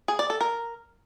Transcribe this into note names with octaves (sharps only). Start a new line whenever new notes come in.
G#4
D5
A4
A#4